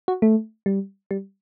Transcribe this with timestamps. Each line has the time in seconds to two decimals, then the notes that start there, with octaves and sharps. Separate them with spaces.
0.08 F#4
0.22 A3
0.66 G3
1.11 G3